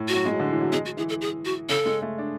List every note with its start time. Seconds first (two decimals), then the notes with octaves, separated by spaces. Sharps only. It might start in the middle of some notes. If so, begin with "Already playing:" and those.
Already playing: A2
0.08 F#4
0.13 F#3
0.25 G#3
0.39 D3
0.50 E3
0.62 F#3
0.72 G#3 G#4
0.86 F#4
0.97 E3 G#4
1.09 A4
1.21 G#4
1.45 F#4
1.69 C#3 A4
1.86 G#3
2.02 A3
2.18 D4